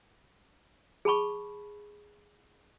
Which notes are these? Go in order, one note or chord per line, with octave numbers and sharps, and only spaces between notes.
G#4 A5 B5 C#6